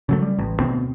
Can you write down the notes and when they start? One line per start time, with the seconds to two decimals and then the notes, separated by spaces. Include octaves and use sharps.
0.09 C#3 F#3 A3
0.22 G3
0.39 A1
0.60 D2 B2 C4